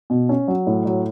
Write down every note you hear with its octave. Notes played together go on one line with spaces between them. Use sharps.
B2
C#4
F#3
A2
F#3